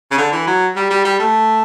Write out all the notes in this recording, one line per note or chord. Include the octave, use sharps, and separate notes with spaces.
C#3
D3
E3
F#3
G3
G3
G3
A3